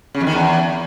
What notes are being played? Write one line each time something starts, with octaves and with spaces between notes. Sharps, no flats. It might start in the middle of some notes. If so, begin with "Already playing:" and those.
C#3
F2
D#3
E2